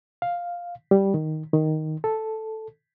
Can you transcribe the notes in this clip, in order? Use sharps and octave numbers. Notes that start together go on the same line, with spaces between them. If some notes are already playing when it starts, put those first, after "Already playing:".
F5
G3
D#3
D#3
A4